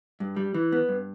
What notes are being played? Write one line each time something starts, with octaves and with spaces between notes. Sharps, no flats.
G2
G3
E3
B3
G2